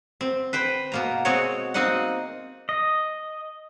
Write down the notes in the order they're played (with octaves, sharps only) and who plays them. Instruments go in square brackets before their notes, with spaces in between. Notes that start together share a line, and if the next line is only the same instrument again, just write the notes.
[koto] C4
B4 C5 G5
B2 A#3 A#5
B2 G#3 C4 F#4 C#5
A#3 C4 D#4 D#5 F#5
[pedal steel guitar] D#5